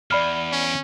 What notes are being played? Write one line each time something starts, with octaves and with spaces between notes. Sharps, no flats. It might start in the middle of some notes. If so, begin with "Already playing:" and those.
E2 D5 B5 F6
C#4